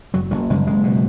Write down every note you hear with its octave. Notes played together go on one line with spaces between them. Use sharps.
F#1 F#3
F#1 F#3
F#1 G#3
F#1 G#3
B2